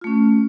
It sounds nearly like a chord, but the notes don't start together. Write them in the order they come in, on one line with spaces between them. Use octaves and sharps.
F4 A3 C#4